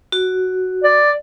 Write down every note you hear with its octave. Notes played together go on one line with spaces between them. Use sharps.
F#4
D5